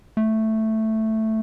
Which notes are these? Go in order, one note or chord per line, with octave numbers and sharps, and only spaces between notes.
A3